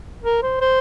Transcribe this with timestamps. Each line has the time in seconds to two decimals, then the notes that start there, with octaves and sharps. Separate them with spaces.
0.23 A#4
0.43 C5
0.61 C5